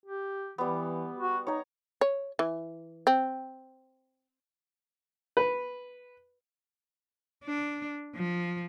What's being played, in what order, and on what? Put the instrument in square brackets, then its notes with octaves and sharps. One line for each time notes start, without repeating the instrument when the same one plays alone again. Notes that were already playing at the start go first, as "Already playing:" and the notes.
[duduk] G4
[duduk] E3 [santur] G3 B3
[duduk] F#4
[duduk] D#4 [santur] C#5 A#5
[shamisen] C#5
E3
C4
[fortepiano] B4
[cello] D4
F3